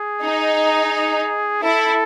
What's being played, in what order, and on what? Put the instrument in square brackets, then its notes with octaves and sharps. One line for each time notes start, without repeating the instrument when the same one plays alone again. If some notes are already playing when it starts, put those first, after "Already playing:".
Already playing: [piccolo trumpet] G#4
[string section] D#4
[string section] E4 [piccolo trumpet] A4